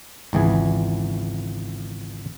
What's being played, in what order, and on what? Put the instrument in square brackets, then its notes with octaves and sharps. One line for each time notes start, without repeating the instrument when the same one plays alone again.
[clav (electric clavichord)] G#1 C#2 E3 G#4